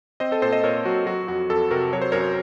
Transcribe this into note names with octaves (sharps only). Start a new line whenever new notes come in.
C4 C5 D#5
A4 C5
A#2 A4 C5
C5 D#5
A#2 A#4 C#5
F#3 F#4
F#3 F#4
F2 F#4
F2 A4
C3 F#4 A#4
F#3 C#5
C5
F#2 A#4 C#5